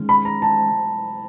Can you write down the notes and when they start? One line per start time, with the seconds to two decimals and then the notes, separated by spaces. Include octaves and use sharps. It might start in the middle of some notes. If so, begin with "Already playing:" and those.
Already playing: D#3 G#3 C#4
0.09 B5
0.25 A#5
0.42 A5